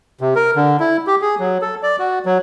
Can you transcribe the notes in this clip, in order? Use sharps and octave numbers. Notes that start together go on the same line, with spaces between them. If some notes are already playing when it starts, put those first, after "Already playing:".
C3
A#4
D3
E4
G4
G#4
F#3
A4
D5
F#4
F#3